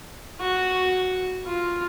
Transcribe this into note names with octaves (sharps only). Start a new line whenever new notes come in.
F#4
F4